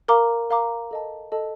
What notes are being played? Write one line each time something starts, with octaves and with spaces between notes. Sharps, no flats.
A#4 F5 A#5 D6
A#4 F5 A#5 D6
A4 D#5 A5
A4 D#5 A5